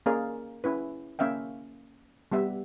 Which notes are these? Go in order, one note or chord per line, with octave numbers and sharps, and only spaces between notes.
A#3 C#4 G#4 A#4 D5 F5
C#4 E4 B4
A#3 C#4 E5 F5 G5
G3 B3 G4 E5